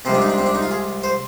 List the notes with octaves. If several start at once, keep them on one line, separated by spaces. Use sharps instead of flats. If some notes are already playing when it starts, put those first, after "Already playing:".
C2 C3 F3 G#3 C4
D4
D#4
D4
C4
D4
D#4
F4
G#4
C5